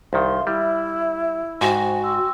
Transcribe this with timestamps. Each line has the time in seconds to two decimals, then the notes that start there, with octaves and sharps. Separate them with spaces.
0.13 C2 D#3 E5 F5 C6
0.47 G3 E4 E5
1.61 G#2 F#4 C5 G5 G#5
2.03 G5 C6 E6